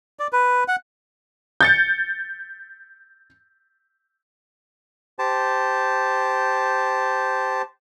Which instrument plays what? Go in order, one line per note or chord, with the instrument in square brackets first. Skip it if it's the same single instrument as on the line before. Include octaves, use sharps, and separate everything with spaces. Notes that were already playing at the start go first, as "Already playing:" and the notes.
[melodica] D5
B4
F#5
[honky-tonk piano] G6 A6 C#7
[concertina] G4 C5 A5